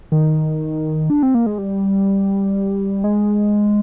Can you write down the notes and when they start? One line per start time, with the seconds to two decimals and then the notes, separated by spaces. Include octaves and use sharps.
0.12 D#3
1.10 D4
1.23 C4
1.35 A#3
1.46 G#3
1.58 G3
3.04 G#3